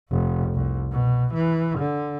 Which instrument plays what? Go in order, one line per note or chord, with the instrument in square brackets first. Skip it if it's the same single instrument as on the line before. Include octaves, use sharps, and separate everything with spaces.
[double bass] F1
C2
B2
E3
D3